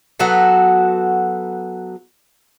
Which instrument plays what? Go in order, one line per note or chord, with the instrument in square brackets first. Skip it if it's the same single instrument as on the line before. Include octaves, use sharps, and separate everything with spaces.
[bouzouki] F#3 B3 F#4 A4